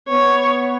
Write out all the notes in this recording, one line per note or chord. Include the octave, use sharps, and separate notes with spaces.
B3 C#5